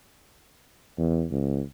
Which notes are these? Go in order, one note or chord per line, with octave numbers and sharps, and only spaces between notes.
E2
C#2